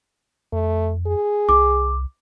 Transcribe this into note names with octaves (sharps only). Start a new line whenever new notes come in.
F2 A3
G#4
C2 D6